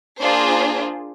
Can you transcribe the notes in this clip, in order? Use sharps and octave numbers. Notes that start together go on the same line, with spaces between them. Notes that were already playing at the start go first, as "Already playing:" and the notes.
A#3 D4 F4 G#4 C5